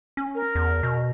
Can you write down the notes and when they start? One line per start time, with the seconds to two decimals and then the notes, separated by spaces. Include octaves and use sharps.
0.17 C#4
0.35 A#4
0.55 E2
0.83 B2